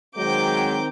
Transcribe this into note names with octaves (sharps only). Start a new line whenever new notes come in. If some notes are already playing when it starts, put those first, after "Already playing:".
D#3 F#3 G#3 C4 A#5 D6 G6